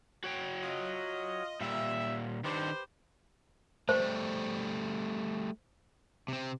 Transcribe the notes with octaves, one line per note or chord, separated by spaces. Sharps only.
F#4 C#5 G5
F4 D#5
A#2 G3 E5
D#3 D4 G4 B4 C5
G3 A3 C5
C3 C4